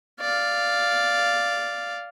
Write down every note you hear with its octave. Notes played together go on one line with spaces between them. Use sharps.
D5 F5